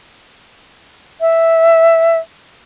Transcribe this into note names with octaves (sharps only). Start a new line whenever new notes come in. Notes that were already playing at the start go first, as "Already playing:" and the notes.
E5